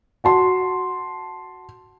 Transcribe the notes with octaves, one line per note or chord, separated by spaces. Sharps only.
F#4 A5 C6